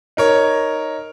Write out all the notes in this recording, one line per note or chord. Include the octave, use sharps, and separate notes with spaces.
D#4 A#4 C#5